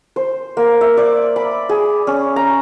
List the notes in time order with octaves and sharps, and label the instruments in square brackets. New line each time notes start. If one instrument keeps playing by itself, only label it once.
[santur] C5
A#3
E5
D5
B5
G#4
C#4
A#5